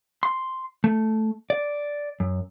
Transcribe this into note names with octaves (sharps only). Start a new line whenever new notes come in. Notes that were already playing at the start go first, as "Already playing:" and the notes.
C6
A3
D5
F#2